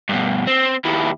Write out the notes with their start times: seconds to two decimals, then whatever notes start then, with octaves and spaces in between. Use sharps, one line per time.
0.09 G2 B2
0.47 C4
0.85 D#2 E4